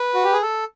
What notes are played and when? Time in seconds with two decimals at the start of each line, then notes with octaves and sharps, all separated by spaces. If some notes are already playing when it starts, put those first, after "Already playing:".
Already playing: B4
0.14 F#4
0.24 G4
0.33 G#4
0.42 A4